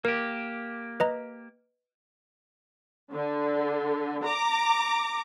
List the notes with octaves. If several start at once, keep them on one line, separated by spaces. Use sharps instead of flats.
A#3 G4 A#4
B4 D#5 A#5
D3
A#5 D6